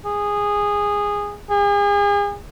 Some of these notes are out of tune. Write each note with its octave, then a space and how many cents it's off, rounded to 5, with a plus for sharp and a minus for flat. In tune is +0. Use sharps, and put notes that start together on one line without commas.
G#4 -15
G#4 -40